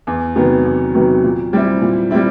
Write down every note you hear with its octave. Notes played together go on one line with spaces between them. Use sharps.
E2
C3 D#3 F#3 B3
E2
C3 D#3 F#3 B3
A#2
G3 C4 E4
A#2
G3 C4 E4